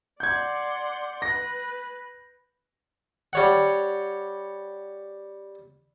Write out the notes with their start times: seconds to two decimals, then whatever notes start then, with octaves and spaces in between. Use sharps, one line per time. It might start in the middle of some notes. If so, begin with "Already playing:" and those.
0.20 D5 F#5 C6 G6 G#6
1.22 B4 A#6
3.33 G3 C#5 F#5